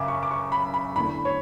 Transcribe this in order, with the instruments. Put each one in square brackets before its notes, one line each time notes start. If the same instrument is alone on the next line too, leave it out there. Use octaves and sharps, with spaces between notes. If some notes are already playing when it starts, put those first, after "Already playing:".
Already playing: [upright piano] F#2 C#3 [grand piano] E5 D6
[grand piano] C#6
D6
C#6
B5
B5
[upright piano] E2 D3 A3 [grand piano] B5
[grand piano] C#5